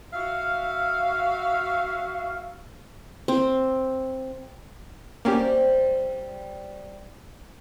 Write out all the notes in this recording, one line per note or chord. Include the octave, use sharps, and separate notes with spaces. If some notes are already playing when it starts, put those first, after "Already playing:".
F#4 E5 F5
C4
G3 A#3 C4 C#4 G4